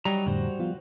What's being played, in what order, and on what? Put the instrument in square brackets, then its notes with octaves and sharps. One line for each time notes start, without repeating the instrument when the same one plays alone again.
[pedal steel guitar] F#3 D#4 A#5 [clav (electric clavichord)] G3
[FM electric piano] F2 A2 D3 [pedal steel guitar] F#4 C5
[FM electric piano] F3 B3 F4